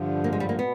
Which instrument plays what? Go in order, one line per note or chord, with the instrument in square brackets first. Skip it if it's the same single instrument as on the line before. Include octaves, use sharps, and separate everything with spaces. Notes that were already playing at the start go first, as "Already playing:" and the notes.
Already playing: [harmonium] G2 D3 F3
[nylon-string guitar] A#3
G#3
G3
A#3
[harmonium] B2 [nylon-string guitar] B3